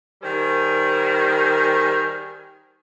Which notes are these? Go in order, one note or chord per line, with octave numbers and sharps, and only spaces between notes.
D#3 G3 G#4 A#4 C5